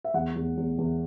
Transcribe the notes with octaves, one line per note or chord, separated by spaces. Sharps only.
E5
E2 F#5
E2
E2
E2